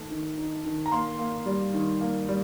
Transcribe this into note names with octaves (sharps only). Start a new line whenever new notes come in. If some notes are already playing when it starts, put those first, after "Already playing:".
Already playing: D#3 A3
D#3
D#4
D#3
A#5
A#3 C6
A#3
G3
D#3
A#3
G3